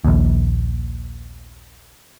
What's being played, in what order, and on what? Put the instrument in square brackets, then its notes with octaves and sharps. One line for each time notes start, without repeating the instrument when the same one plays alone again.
[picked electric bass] A#1 D#2